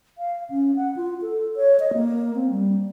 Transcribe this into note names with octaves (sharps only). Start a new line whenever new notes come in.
F5
C#4
F#5
F4
A4
C#5
D#5
A#3
C4
G3